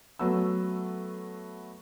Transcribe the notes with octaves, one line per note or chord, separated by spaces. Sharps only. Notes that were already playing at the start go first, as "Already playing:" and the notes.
F#3 A3 B3 E6